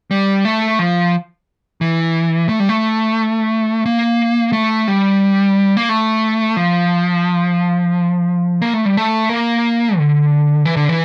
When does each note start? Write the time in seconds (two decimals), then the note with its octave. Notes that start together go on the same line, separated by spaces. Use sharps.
0.11 G3
0.45 A3
0.79 F3
1.81 E3
2.49 A3
2.60 G3
2.69 A3
3.86 A#3
4.53 A3
4.88 G3
5.77 A#3
5.89 A3
6.57 F3
8.62 A#3
8.74 A3
8.85 G3
8.97 A3
9.30 A#3
9.98 D3
10.65 E3
10.76 D3
10.89 E3